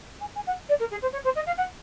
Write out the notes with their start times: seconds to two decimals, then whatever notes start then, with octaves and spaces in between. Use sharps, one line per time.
0.21 G#5
0.35 G#5
0.47 F#5
0.69 D5
0.80 A#4
0.91 G#4
1.02 C5
1.12 C#5
1.24 C5
1.35 D#5
1.46 F5
1.58 F#5